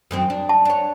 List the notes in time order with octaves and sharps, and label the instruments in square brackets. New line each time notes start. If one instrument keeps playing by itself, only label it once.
[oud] F#2 D#3 C4
D4
[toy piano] A5
[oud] D4 C#5